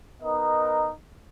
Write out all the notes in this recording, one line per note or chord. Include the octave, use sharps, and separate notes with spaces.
B3 D#4 A#4 D#5